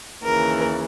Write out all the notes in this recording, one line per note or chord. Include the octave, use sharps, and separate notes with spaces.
D#2 C#3 E3 A#4